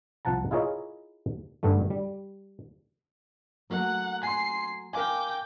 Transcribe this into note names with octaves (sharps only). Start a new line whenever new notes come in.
C2 F3 F#5 A5 A#5
E4 F4 G#4 A#4 C#5 D#5
G2 D3 G3 A3
G3
F#3 A3 A#3 F#5
G#5 C6 C7
A#4 F5 G5 G#5 D6